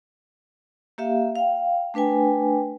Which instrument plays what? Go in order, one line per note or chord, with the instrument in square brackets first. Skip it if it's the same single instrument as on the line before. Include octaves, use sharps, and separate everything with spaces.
[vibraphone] A#3 G4 E5 F5
F5 G5
A3 D4 B4 G5 G#5